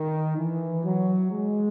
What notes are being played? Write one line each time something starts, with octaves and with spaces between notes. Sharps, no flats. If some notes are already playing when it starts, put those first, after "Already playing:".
Already playing: D#3
E3
F#3
G#3